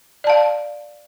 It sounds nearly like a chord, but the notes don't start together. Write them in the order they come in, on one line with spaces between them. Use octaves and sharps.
D5 A5 F5